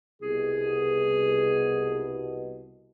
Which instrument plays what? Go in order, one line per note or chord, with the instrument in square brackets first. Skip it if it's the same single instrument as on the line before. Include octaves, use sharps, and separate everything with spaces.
[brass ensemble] C2 B2 [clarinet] G#4